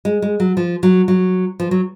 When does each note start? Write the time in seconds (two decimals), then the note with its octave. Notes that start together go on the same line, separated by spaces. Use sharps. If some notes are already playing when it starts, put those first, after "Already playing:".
0.05 G#3
0.22 G#3
0.40 F#3
0.57 F3
0.83 F#3
1.08 F#3
1.60 F3
1.71 F#3